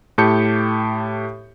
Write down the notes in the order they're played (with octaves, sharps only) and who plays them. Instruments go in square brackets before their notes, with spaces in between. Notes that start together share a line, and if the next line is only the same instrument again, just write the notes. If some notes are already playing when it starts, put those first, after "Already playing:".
[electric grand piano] A2 G4 A5 G6 C#7